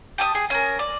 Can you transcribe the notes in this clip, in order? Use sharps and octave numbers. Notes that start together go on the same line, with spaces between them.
G4 A5 D#6
G#4
C#4 A#4
D5